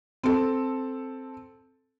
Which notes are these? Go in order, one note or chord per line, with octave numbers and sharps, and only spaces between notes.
C4 A4